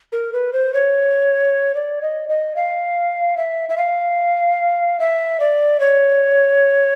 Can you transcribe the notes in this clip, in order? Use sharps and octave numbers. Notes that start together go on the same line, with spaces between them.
A#4
B4
C5
C#5
D5
D#5
D#5
F5
E5
E5
F5
E5
D5
C#5